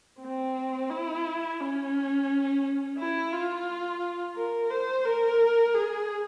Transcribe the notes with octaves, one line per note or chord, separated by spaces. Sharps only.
C4
E4
C#4
E4
F4
A#4
C5
A#4
G#4